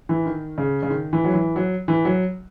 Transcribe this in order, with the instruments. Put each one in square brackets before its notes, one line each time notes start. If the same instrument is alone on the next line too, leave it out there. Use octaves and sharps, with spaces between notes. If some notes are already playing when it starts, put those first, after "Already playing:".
[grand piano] E3
D#3
C#3
C#3
D#3
E3
F#3
E3
F#3
E3
F#3